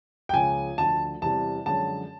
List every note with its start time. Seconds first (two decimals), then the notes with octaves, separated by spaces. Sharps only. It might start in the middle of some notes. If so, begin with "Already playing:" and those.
0.29 G5
0.33 C#2 C#3 F3 G#3 G#5
0.78 D2 D3 F3 A5
1.22 E2 C3 E3 G3 A5
1.65 F#2 D3 F3 G#3 C#4 A5